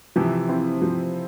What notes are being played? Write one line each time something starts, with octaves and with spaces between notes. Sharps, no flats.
C3 E3 F3
C4 E4
F3